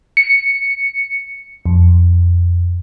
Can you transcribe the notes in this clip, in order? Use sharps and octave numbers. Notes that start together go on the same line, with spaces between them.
C#7
F2